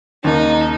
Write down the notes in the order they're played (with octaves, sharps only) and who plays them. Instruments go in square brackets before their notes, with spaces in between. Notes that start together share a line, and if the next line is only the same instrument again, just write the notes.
[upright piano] D#2 C#3 A#3 [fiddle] D#4